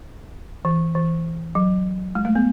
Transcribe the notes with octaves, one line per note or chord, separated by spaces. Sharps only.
E3
E3
F#3
G#3
A3
B3